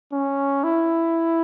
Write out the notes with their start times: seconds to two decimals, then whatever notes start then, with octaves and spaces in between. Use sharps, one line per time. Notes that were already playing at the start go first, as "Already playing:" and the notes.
0.12 C#4
0.64 E4